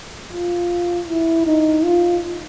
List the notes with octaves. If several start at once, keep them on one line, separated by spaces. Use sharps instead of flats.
F4
E4
D#4
F4